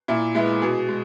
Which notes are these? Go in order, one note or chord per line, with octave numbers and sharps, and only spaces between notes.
A#2 E4
G#3 B3 E4
B2 G#4
G#3